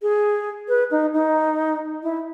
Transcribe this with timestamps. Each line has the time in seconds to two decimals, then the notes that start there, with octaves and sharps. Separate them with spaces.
0.02 G#4
0.68 B4
0.91 D#4
1.14 D#4
2.03 E4